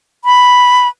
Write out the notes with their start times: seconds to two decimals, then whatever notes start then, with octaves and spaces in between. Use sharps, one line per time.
0.25 B5